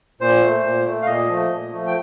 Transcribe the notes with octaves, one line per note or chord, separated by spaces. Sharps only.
A#2 C5
A3
A#2
A3
F5
A#2 D#5
F3 A3
A#2
F3 A3
G5